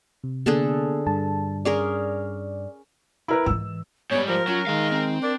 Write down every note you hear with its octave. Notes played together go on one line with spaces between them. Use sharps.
C3
D3 A#3 B3 G#4 A4
G2 A5
C#4 G#4 A#4 D5
E4 A#4 B4
G#2 E3 E6
G#2 G3 B3 C#5
F3 A#4 C5
F#3 C#4 F4
D#3 G#3 D#4 F5
C4
D4 A#4 D5